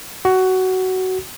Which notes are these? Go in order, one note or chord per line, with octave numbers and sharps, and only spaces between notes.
F#4